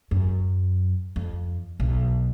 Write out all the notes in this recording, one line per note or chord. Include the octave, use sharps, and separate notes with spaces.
F#2
F2
B1